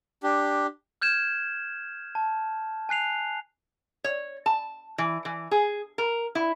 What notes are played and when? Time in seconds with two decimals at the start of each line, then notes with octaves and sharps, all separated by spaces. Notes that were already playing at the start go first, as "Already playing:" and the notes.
0.23 D4 G4
1.02 F6 G6 G#6 E7
2.15 A5
2.89 G#5 F#6 C7 F7
4.04 C#5
4.46 A5
4.98 E3
5.25 E3
5.51 G#4
5.98 A#4
6.35 E4